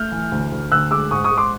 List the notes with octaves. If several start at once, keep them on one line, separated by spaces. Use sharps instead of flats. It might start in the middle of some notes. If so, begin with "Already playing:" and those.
Already playing: A3 F6 G6
E3
D2
D2
D2 E6 F#6
G#3 D6 E6
G#2 C#6 D#6
C#6 D#6
G#2
C6 D6